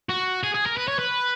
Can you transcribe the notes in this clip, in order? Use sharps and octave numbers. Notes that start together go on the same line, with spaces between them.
F#4
G#4
G#4
A#4
B4
C#5
B4